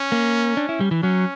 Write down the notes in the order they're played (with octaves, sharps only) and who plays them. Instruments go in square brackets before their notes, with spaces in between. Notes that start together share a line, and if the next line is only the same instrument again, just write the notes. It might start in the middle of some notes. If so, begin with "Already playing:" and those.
Already playing: [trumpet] C#4
[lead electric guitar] A#3
D4
E4
G3
E3
[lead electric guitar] F#3 [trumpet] C#4